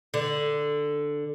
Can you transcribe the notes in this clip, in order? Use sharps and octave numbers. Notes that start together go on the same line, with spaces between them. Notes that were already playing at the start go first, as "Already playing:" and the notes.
D3